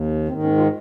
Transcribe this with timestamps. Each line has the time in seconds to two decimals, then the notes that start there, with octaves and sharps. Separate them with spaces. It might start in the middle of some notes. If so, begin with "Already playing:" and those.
Already playing: D#2
0.28 G#2 D#3 C4
0.43 C#4
0.58 F4